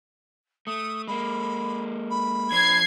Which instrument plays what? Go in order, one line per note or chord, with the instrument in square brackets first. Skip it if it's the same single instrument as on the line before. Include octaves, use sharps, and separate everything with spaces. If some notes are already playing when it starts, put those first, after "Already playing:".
[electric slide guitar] A3 [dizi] D#6
[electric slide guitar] G#3 A#3 [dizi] B5
[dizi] B5
[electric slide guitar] F3 D4 C5 [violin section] G#6 C7